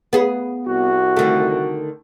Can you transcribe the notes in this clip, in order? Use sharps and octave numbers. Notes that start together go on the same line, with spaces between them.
B3 G#4
C2 F#4
D3 D#3 A3